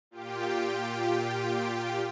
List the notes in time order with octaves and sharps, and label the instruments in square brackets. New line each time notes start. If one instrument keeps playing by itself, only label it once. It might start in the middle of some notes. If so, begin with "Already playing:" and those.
[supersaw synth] A#2 F4 G4 G5